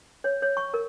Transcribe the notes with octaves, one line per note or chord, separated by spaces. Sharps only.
C#5
C#5
C#6
A#4